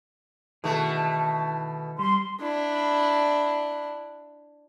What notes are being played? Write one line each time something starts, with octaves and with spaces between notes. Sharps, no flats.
B2 D#3 E3 A3 G#4
G3 C6
D4 E4